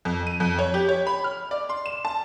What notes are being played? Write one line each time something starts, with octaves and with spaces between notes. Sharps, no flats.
F2
D#7
F2
C#5
G4
C#5
B5
F6
D5
C6
E7
A5